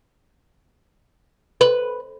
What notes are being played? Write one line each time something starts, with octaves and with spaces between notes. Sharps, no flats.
B4